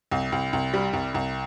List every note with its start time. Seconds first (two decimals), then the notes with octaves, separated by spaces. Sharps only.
0.11 C2
0.32 C2
0.53 C2
0.74 G3
0.93 C2
1.14 C2